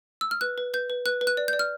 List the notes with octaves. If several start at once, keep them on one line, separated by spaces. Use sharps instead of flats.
E6
F6
B4 F#6
B4
B4 G6
B4
B4 F#6
B4
F#6
D5
D5 G6
F6